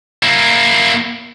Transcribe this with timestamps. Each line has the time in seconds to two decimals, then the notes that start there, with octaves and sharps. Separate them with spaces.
0.23 A#3 E4